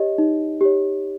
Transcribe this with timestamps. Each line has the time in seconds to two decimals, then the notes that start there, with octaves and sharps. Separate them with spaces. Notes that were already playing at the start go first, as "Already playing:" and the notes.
Already playing: G4 C#5 D#5
0.18 D#4
0.61 G4 C#5